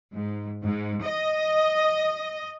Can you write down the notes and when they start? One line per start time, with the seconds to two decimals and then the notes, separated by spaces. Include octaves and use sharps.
0.13 G#2
0.63 G#2
1.03 D#5